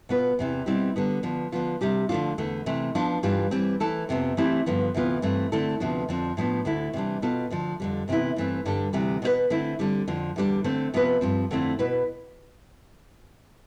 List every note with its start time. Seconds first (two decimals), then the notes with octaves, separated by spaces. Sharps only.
0.09 B2 B3 F4 B4
0.39 E2 C3 E3
0.66 B2 G3 C4 E4 G4
0.96 D3 G3 B3
1.23 D3 F3 B3
1.52 D3 F3 B3 F4
1.81 C3 G3 D4 G4
2.09 D3 F3 A3 D4 F4
2.38 E2 D3 A3
2.66 C3 E3 A3
2.95 F3 B3 D4 F4
3.23 G2 E3 G3 D4 F4
3.51 E3 G3 C4
3.80 E3 A3 E4 A4
4.09 F2 C3 F3 B3
4.37 E3 A3 C4 E4 G4
4.66 G2 D3 F3 B3
4.94 D2 C3 E3 B3 F4
5.22 G2 E3 A3 C4
5.52 D3 A3 C4 E4 A4
5.80 D2 C3 F3 B3 D4
6.09 F2 D3 F3 C4
6.37 A2 F3 B3 D4
6.65 D2 D3 A3 E4
6.93 C3 E3 G3 D4
7.22 B2 B3 F4 A4
7.50 D2 D3 F3
7.80 F2 D3 G3
8.08 D2 C3 E3 B3 E4
8.36 G2 E3 A3 C4
8.65 G2 D3 G3 D4 A4
8.93 D2 C3 E3 G3
9.22 B2 B3 F4 B4
9.50 D3 A3 C4 E4
9.79 D3 G3 C4
10.08 F2 D3 F3
10.36 E2 D3 G3 D4
10.64 D3 A3 C4
10.94 C3 F3 B3 F4 B4
11.21 G2 F3 C4
11.51 F2 D3 A3 C4 E4
11.79 B2 B3 E4 B4